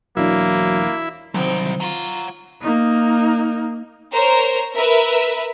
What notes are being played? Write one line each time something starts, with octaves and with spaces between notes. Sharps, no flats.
E1 E3 F#3 A#3 D4 E4
C2 D3 D#3 F#3 C4 D#4
F4 F#5 A#5
A#3 D#4
A#4 C5 C#5 A#5
A#4 B4 E5